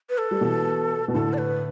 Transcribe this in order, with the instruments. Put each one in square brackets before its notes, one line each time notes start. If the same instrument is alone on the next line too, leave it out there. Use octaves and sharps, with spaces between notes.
[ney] B4
A4
[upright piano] G3
B2 E3
B2
[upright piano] A2 D3 [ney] A4
[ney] D5
B4